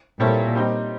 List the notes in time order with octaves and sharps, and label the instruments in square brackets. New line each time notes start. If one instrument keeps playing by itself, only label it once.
[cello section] A#2 [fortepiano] G3 C4 E4 A4 C#5
[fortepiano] G3 C4 D#4 G4